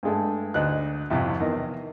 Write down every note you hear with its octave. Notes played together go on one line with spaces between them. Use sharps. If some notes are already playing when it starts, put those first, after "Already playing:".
G2 G#3 A3
D2 D#4 F#6
C2 F2 C3
E2 D#3 D#5